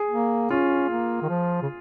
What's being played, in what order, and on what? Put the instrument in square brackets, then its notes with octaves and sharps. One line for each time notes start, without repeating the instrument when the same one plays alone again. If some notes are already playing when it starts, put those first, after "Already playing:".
Already playing: [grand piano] G#4
[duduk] A#3
[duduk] C#4 [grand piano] F4
[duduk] A#3
D#3
F3
C#3